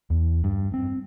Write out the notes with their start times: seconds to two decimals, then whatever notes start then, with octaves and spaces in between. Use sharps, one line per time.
0.10 E2
0.44 G2
0.74 C4